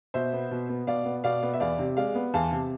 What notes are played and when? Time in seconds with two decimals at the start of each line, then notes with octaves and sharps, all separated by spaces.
0.14 B2 C5 E5
0.33 B3
0.51 B2
0.69 B3
0.87 B2 D5 F5
1.05 B3
1.24 B2 D5 F5
1.43 B3
1.53 E5
1.60 E2 D5 F5
1.79 C3
1.97 G#3 D5 F5
2.15 B3
2.34 E2 F5 A5
2.51 C3